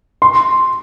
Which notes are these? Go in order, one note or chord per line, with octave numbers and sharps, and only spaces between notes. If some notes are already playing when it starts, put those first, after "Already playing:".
C6